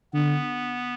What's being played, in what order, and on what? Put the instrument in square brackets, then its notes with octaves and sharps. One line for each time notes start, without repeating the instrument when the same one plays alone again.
[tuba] D3 [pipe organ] B3